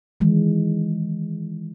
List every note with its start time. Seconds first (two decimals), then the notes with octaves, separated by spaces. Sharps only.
0.21 D#3 E3 G#3